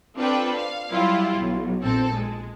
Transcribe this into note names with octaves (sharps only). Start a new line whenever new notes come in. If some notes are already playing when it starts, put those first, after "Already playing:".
C4 D4 F4 A4 B4 G5
F5
F#3 G3 E4 F4 G4
B1 F#3
A#1 C4 A4
G#3